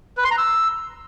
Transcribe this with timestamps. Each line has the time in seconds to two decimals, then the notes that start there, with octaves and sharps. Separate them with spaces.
0.17 B4
0.24 C6
0.31 A#5
0.38 E6